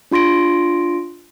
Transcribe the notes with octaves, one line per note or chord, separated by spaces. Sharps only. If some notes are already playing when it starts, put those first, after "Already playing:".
D4 F4 C6 A#6 D7